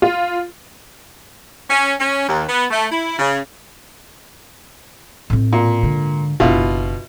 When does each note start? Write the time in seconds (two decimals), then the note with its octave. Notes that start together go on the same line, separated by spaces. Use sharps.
0.02 F4
1.70 C#4
2.00 C#4
2.28 D#2
2.48 B3
2.71 A3
2.91 E4
3.19 C#3
5.30 A2 C4
5.53 A#2
5.82 G#2 D3
6.40 F#1 B2 D4 E4 F4